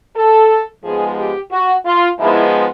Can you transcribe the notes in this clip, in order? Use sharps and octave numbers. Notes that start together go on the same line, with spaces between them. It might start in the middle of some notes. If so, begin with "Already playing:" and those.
A4
G#2 F3 G#3 B3 G#4
G4
F#4
F4
G#2 F3 G#3 B3 E4